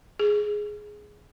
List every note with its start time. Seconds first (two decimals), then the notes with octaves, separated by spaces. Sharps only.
0.19 G#4